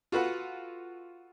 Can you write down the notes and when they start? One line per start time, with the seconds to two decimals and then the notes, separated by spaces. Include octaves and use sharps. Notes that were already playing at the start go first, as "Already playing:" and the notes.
0.12 F4 F#4 A4 B4 F#5